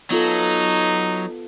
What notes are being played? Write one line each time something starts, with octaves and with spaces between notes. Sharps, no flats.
F#3 B3 D#4 F4 A4